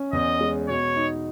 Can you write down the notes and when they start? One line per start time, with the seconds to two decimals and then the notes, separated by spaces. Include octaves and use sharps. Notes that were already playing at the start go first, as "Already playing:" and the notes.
Already playing: C#4
0.13 E2 D#5
0.41 G#3
0.68 B2 C#5
0.96 D#4